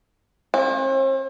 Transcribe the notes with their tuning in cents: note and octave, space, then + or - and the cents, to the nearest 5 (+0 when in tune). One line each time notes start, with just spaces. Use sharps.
C4 +45